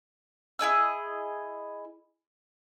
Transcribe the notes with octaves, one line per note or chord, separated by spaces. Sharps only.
E4 G#4 D#5 E6